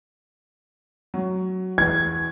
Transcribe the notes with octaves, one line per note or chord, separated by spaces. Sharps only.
F#3
E2 G#6